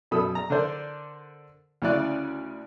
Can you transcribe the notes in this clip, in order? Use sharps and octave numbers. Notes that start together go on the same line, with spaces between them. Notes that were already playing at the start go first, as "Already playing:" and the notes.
F#2 B2 A4 B5 D#6
A#5
D3 D4 A4 A#4 C5 D5
D2 C#3 C#4 E4 D5 F#6